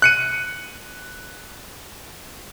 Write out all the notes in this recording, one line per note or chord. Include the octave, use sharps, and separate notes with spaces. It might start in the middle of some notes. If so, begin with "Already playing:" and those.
F#6 C#7 D#7